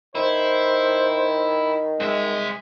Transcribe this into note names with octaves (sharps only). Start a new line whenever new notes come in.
D#3 E4 C5
C2 G#3 E5